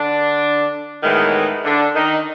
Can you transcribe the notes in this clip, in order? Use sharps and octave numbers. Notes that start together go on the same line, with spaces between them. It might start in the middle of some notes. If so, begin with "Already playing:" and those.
Already playing: D3 D4
A2 D#3 E3 G#3 B3 D#4
D3 D4
D#3 D#4